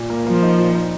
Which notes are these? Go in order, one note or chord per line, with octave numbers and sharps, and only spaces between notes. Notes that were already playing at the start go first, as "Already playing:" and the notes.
Already playing: A#2
A#3
F3 A#3
D#4
A#2
D#4